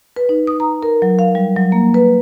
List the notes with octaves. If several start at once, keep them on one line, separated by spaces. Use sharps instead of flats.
B4
D#4
D#6
A#5
A#4
F#3
F5
G3
F#3
A#3
B4